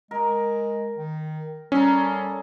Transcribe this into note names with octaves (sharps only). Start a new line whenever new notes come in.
G#3 A#4
D#3
G3 C#4 G#4 A4 A#5